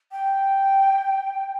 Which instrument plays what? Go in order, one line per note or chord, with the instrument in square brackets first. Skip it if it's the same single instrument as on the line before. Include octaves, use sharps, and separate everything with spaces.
[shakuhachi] G5